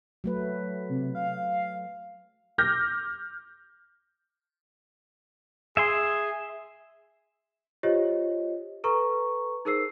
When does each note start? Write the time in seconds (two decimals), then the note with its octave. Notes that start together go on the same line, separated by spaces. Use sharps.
0.24 F#3 A3 B4
0.89 C3
1.15 F5
2.58 D6 F6 G6 A#6
5.77 G#4 E5 G#5 C6
7.83 F4 G4 C5 C#5 D#5
8.84 A4 B4 A#5 C#6
9.65 D#4 G#4 A#4 C5 E6 C7